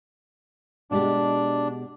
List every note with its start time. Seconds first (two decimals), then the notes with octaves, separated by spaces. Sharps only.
0.91 B2 G#3 D4 G4